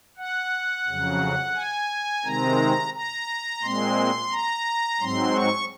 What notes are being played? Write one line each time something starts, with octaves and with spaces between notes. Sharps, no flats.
F#5
F2 C#3 F#3
G#5
C3 D#3 G#3 C4 A#5
A#5
A#2 G#3 C4 C6
A#5
G#2 F#3 C4 C6
C#6